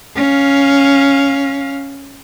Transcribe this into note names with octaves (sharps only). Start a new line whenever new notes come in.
C#4 F5